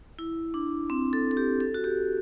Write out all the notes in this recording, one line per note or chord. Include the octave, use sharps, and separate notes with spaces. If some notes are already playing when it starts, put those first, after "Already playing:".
E4
D4
C4
A4
A4
G4
A4
F#4
G4